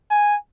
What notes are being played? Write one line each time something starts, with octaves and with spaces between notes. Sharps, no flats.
G#5